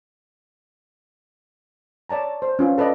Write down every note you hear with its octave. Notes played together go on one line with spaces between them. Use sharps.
C#5 D5 A5 A#5
C5
C#4 F4 B4
A4 B4 D5 D#5